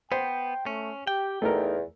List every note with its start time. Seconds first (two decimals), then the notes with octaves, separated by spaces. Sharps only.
0.12 B3 C5 G5
0.66 A3 C#4
1.07 G4 G5
1.42 E2 A3 D#4 A#4